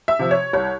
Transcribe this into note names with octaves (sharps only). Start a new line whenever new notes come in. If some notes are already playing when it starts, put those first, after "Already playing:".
E5
C3 F3
C#5
C2 C#5